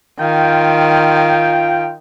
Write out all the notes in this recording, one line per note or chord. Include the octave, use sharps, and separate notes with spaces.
D#3 F4 G5